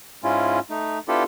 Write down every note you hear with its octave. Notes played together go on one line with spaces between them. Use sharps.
G#2 G#3 C#4 E4 F4
A3 D#4
B3 D4 E4 F4 G4 A4